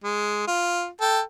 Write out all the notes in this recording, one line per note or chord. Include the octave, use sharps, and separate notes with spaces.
G#3
F4
A4 G5